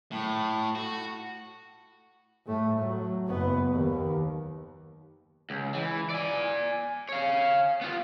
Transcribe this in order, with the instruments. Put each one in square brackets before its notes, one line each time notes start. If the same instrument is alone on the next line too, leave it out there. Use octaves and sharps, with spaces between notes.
[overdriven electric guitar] A2
F#4
[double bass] A2 A3
F#3
F#1 B3
D#2
[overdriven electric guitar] C#2
E3
D5 G#5
C#5 F5
B3 F4